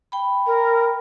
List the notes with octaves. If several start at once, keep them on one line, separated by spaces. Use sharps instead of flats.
G5 B5
A#4